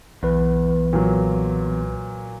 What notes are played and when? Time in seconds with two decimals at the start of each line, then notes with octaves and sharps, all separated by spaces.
0.23 B1 E2 B4
0.93 A#2 F#3